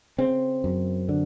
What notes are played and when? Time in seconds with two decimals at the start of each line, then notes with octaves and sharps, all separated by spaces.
0.18 C#3 C4
0.64 F#2
1.09 D3